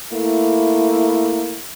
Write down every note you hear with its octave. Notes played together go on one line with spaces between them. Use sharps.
A3 A#3 E4